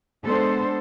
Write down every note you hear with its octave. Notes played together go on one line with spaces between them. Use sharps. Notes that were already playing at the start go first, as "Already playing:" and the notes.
G#3 B3 D4 A4 C5